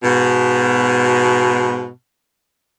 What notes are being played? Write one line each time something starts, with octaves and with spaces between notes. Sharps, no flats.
G#2 B2